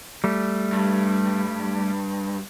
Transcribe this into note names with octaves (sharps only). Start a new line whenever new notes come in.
G3 A3
G2